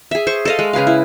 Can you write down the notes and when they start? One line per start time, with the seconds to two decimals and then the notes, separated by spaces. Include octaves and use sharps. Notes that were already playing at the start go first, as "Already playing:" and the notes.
0.11 G#4 E5
0.27 C5 C#6
0.45 A4 D#5 F5
0.59 G#3
0.73 C#3 G#4 B4 F5
0.87 E4